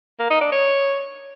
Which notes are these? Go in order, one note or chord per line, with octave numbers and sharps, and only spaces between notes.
A#3
D#4
D4
C#5